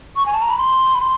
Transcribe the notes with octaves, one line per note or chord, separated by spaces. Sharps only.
C#6
G#5
A5
A#5
B5
C6
B5
C6